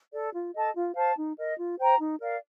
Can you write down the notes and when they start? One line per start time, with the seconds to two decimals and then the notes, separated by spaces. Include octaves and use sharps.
0.12 A4 D5
0.33 F4
0.54 A4 D#5 A5
0.74 F4
0.95 C5 F5 A5
1.16 D#4
1.37 A#4 D#5
1.57 F4
1.78 C5 G5 A#5
1.98 D#4
2.19 A#4 D5 F5